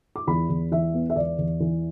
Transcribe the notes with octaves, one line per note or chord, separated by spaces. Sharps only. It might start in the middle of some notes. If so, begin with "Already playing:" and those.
D6
E2 B5
E2
E3 E5
B3
E5
E2 D5
E2
E3